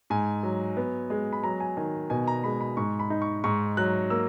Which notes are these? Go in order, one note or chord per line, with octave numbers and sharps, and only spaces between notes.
G#2 G#5
F#3
B3
G#3
B5
F#3 A#5
G#5
D#3 G#5
B2 G#5
A#5
G#3 B5
B5
G#2 C#6
B5
D#4
C#6
G#2 C#6
F#3 F#6
A#3 E6